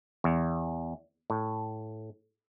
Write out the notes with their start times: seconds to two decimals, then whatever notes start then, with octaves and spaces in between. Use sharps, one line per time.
0.24 E2
1.30 A2